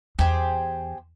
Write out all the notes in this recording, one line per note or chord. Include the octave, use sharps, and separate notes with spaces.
E2 G4 G#4 C5